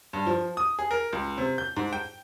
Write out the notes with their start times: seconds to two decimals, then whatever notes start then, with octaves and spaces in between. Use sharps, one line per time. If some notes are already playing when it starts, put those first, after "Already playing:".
0.13 G2
0.27 F3
0.57 D#6
0.79 G#4
0.91 A#4
1.13 C#2
1.38 C3
1.58 G6
1.77 G#2
1.93 G5